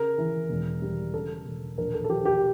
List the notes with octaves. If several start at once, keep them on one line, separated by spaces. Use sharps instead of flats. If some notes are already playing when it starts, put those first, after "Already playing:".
Already playing: C#3 A#4
E3
E1
G3
C#3 A4
E1
A#1 A#4
A4
A4
F3 G4
G4